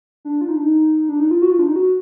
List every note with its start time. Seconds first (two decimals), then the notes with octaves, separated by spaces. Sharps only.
0.25 D4
0.41 F4
0.48 D#4
0.56 D4
0.63 D#4
1.09 D4
1.20 D#4
1.31 F4
1.42 F#4
1.51 F4
1.59 D4
1.67 D#4
1.76 F#4